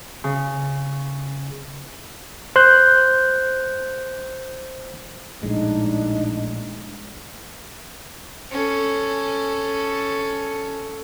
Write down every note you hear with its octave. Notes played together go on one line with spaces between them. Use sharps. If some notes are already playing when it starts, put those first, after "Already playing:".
C#3
C5 F#6 G6
A#1 A2 G#3 D4 D#4
C#4 A4